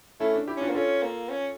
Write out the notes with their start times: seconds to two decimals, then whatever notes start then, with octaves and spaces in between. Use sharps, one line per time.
0.20 A3 C#4 E4
0.34 D4
0.47 E4 G4
0.57 C#4 D4 F4
0.69 A#3
0.75 C#4 F4 A4
1.03 A#3
1.29 C#4